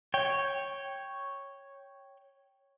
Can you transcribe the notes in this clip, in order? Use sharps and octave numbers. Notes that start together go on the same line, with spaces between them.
C#5 G5